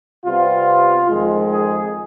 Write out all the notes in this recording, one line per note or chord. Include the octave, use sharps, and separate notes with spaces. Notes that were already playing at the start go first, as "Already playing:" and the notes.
C3 G3 B3 F4
F2 D#3 G#3
G#4